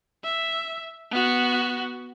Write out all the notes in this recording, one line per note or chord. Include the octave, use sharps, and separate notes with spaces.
E5
B3 F#4